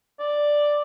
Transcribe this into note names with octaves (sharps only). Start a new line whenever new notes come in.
D5